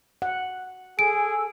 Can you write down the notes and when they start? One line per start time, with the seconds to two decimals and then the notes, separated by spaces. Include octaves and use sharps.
0.22 F#5
0.99 G#4 A4 G#5 E6 D7